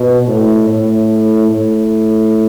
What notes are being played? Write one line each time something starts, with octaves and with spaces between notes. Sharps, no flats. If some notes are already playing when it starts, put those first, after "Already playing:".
Already playing: B2
A2
A2
A2